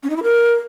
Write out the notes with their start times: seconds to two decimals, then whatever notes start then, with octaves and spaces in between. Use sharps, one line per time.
0.03 C#4
0.10 D#4
0.16 E4
0.23 A#4